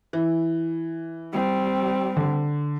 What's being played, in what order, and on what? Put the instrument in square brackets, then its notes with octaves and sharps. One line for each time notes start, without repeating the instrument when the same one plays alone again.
[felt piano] E3
[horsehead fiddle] G3 C4
[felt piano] D3